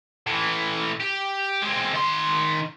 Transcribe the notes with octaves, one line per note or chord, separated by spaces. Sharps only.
A2 E3
G4
G#3 C4
D#3 C6